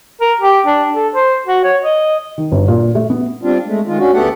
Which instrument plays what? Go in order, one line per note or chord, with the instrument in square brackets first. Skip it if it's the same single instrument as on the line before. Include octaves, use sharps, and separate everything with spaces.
[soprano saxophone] A#4
G4
D4
A4
C5
F#4
C#5
D#5
[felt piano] D#3
G1
A#2
A3
B3
[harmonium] G3 C4 D4 F4
G#3 A3
D#3 G#3 F4
C#4 D4 F#4
D2 A3 B3 G4 A4 F#5